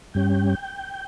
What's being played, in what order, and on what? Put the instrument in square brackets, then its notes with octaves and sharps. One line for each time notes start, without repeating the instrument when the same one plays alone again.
[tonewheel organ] G2 G3 C#4 G5